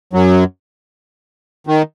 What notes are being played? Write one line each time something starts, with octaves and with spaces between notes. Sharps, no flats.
F#2 F#3
D#3